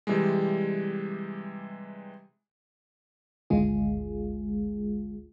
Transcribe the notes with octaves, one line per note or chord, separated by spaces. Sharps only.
C3 E3 G3 G#3
G#1 D2 G#3 F4 G#4